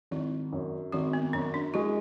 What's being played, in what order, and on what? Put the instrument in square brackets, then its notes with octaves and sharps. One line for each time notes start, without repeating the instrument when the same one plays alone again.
[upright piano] G#1 [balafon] E4
[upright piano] F#2
[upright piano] G#1 [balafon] F#4
[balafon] B3
[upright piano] F#2 [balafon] C#4
[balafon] D4
[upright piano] G#3 [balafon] E4